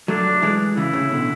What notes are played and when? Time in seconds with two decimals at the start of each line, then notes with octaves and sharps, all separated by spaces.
0.08 F#3 A3 D4
0.42 E3 G#3
0.77 C#3 E3 E4
0.93 A2 C#3
1.11 B2 D3